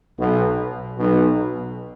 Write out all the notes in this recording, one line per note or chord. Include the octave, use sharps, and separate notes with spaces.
B1 B2
B1 B2